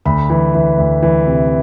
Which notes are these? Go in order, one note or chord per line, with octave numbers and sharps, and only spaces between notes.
D2 B5
E3
E3
D2
E3
C3